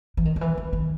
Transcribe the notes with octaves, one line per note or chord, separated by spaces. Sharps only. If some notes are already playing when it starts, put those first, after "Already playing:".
E3
D#3
D#3
E3
D#3
D#3